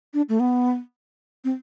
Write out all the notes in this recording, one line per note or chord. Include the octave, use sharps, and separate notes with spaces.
D4
A3
B3
C4